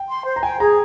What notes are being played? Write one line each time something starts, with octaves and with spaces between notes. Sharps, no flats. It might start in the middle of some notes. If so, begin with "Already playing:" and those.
Already playing: G5
C6
C5
A#5
G5 G#5
G#4 A#5